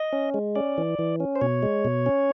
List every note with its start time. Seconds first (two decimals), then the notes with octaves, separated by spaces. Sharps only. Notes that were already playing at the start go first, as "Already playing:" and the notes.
Already playing: D#5
0.13 C#4
0.34 G#3
0.56 C#4 D5
0.78 E3
0.99 E3
1.20 C#4
1.36 C5
1.41 B2 C#5
1.63 G#3
1.85 B2
2.06 C#4